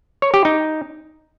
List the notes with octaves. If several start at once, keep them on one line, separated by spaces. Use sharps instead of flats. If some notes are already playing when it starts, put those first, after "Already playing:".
C#5
G4
D#4